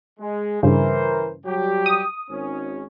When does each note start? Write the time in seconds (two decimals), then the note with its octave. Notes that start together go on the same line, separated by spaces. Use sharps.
0.20 G#3
0.63 G2 C#3 E3 A#4 C5
1.45 F#3 G3 G4
1.86 D#6
2.31 G#1 C#4